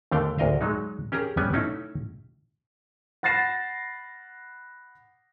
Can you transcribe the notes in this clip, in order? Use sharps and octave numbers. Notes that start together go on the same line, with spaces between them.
D#2 D3 A3 F5 G5
D2 A#4 D#5 F5
F#3 G#3 D#4
C#4 G4 G#4 A#4 A#5
G3 B3 C#4 D5 G#5
A3 C#4 D#4 E4
F#5 B5 A6 A#6 C7 E7